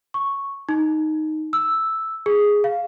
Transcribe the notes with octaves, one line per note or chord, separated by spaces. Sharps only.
C#6
D#4
E6
G#4
F5